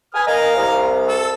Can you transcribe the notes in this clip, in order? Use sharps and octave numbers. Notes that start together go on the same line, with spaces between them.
B4 G#5 D#6 F6
A#4 D#5 F5 A#5
C2
A4